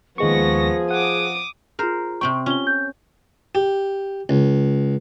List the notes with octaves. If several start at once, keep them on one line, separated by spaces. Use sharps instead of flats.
D#2 F3 G#3 B3 G#4 C#6 A#6
F#5 D6 D#6
F4 G#4 A#4 C5
C3 C4 G5 C#6
C#4 F4 G7
G6
G4
C#2